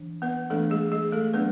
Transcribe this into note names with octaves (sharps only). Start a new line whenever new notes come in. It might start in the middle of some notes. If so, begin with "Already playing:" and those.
Already playing: E3 D4
B3 B4
E3 G#3 A3 B3 D4 A4
G#3 G#4
G#3 G#4
A3 A4
F#3 B3 D4 B4